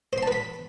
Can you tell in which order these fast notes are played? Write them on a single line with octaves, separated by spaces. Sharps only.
C5 C6 A5 B4 B5